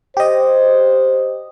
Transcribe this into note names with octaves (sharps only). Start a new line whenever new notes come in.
G4 C5 D#5